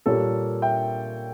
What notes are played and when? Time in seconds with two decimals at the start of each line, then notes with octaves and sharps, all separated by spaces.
0.06 A#2 G3 A#3 A4 C#5
0.62 E5 G5